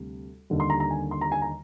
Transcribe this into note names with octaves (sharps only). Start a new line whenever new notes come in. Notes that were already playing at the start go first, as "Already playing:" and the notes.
Already playing: D2 C3 G3
D#2 D3 G3
C6
A#5
A#5
G#5
C6
A#5
G#5
A#5